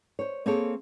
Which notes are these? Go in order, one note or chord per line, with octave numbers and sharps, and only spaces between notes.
C5 C#5
A#3 C4 G#4 A4 C5 C#5